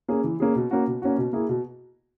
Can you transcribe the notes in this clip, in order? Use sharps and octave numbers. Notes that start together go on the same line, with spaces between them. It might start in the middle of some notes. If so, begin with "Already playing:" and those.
A#3 C#4 G#4
E3
A#3 C#4 G#4
B2
A#3 C#4 F#4
B2
A#3 C#4 F#4
B2
A#3 E4 G#4
B2